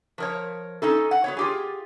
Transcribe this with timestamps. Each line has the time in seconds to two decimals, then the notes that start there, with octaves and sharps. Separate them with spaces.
0.18 F3 A#4 C#5
0.82 C#4 D#4 A4
1.11 F#5
1.24 F#3 B3 C#5
1.37 F4 G4 G#4